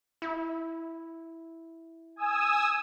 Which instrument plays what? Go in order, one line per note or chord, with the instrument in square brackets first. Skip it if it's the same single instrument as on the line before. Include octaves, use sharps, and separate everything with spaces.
[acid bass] E4
[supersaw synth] G#5 D#6 E6